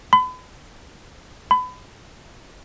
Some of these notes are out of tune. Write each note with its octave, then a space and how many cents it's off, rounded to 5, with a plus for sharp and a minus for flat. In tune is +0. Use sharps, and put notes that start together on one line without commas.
B5 +40
B5 +30